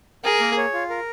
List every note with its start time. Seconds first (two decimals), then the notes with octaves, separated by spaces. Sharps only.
0.24 G#4 A#4
0.40 A#3
0.58 C#5
0.74 F4
0.90 A#4